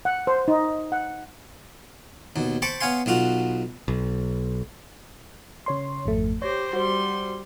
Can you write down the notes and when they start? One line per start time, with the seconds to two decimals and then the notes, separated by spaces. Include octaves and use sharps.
0.05 F#5
0.27 C5
0.48 D#4
0.92 F#5
2.36 D#2 B2
2.62 C5 G5 A5 B5 C#6 D6
2.81 B3 C#5 F5 G#5 C6
3.06 B1 B2 F4 F#4
3.88 B1
5.66 C#3 C#5 C6
6.06 G#1 F2 A3
6.42 G4 C5 C#5 A#6
6.73 G3 F#4 C5 C6